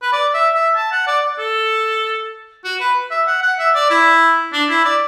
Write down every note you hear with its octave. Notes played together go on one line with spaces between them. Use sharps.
B4
D5
E5
E5
A5
F#5
D5
A4
F#4
B4
E5
F#5
F#5
E5
D5
E4
D4
E4
D5